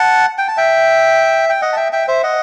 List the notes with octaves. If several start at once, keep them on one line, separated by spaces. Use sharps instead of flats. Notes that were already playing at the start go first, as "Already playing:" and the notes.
Already playing: F#5 A5
G5
A5
E5 G5
G5
D#5 F#5
A5
E5 G5
E5 G5
C5 E5
D#5 F#5